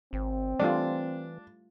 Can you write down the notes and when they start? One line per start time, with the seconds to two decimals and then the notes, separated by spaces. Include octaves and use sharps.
0.13 G#1 C4
0.59 E3 G3 A3 D4 F4